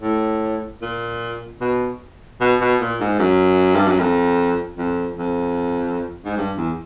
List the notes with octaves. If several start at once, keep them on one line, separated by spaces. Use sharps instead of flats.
A2
A#2
B2
B2
B2
A#2
G#2
F#2
G2
F#2
F2
F2
F2
G#2
G2
E2